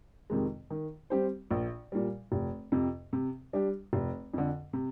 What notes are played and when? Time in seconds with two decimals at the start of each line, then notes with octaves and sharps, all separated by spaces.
0.30 F2 C3 D#3 G#3
0.70 D#3
1.10 G3 C4 G4 C5
1.51 A#1
1.92 A#2 G3
2.32 F1
2.72 F2 C3
3.13 C3
3.53 G3 D4 G4
3.93 F1
4.34 F2 D3
4.73 C3